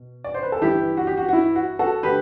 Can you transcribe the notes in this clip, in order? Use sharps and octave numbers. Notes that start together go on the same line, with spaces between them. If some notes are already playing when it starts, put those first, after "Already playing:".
Already playing: B2
D5
C5
B4
A4
G1 G2 E3 E4 G4
F#4
G4
F#4
F#4
E4
F#4
F#4 A4
D3 A3 G4 B4